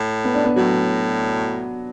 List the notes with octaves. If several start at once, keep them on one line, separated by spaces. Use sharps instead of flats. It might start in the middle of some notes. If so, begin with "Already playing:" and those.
Already playing: A2
B3
D4
B3
A2 F#3